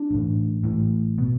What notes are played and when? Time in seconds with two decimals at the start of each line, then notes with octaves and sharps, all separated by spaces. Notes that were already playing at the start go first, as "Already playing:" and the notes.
Already playing: D4
0.11 A1 A2
0.64 A1 A2
1.18 B2